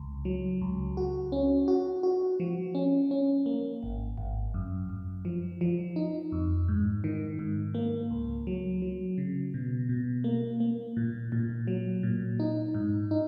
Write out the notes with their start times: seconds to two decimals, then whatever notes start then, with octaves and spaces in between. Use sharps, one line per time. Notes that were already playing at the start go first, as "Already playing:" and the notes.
Already playing: C#2
0.25 F#3
0.62 C#2
0.97 F#4
1.32 C#4
1.68 F#4
2.03 F#4
2.40 F3
2.75 C#4
3.11 C#4
3.46 A#3
3.83 G#1
4.18 G#1
4.54 F#2
4.89 F#2
5.25 F3
5.61 F3
5.96 D#4
6.32 F2
6.68 G#2
7.04 D#3
7.39 G#2
7.74 A#3
8.11 C#2
8.47 F#3
8.82 F#3
9.18 C#3
9.54 B2
9.89 B2
10.24 A#3
10.60 A#3
10.97 A#2
11.32 A#2
11.67 F#3
12.03 A#2
12.40 D#4
12.74 G#2
13.11 D#4